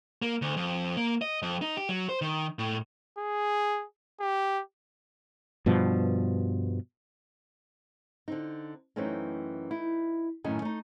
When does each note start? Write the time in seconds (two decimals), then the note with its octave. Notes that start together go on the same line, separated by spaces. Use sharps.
0.22 A#3
0.42 D2
0.57 F2
0.97 A#3
1.22 D#5
1.42 F2
1.62 D#4
1.77 G4
1.89 F#3
2.09 C5
2.21 D#3
2.59 A2
3.18 G#4
4.21 G4
5.66 G2 B2 F3
8.28 D3 C4 D#4
8.96 F#2 E3 A3 C4 C#4 D#4
9.71 D#4 E4
10.44 F#2 A2 D#3 C#4 D#5 G#5
10.62 A3 D#4